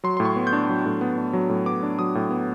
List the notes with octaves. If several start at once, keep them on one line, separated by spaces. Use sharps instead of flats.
F#3 C6
A2 C6
C#6
B3
G6
D4
F#3
A2
B3
D4
F#3
A2
B3 D6
D4
F#3 D#6
A2
B3